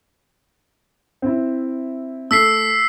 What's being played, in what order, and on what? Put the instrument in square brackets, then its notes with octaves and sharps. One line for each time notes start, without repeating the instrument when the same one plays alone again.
[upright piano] C4 E4
[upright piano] A3 [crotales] E6 B6 C7